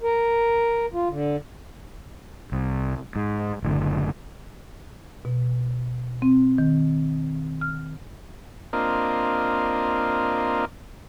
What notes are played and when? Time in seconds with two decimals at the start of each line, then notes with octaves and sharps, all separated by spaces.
0.02 A#4
0.93 F4
1.09 D3
2.52 C2
3.16 G#2
3.62 F#1 A2 D3
5.25 B2
6.22 C4
6.58 D#3
7.61 F6
8.73 A#3 C4 D4 F4 A#4 D#5